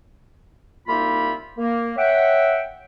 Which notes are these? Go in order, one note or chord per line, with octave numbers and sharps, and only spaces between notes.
C2 A#3 D#4 F4 E5 B5
A#3
C#5 E5 F#5 G5